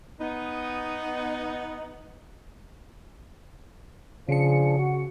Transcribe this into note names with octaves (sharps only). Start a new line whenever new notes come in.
B3 D#4
C#3 F3 D4 G#4 C#7
F#4